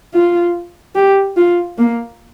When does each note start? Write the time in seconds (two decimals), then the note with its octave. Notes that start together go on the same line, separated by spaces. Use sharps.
0.13 F4
0.95 G4
1.37 F4
1.78 A#3